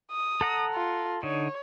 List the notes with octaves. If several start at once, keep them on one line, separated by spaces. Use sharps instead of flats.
D#6
A4 F#5 A#5
F4
D3 D#4 C#5